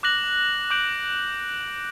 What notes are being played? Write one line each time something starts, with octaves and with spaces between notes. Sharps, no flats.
D6 F#6 A#6 F#7
D6 G6 D7 F#7